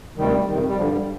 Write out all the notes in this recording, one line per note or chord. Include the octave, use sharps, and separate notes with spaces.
D2 C3 D#3 G3
F2 C3 D#3
G3
G2 D3 F3
G3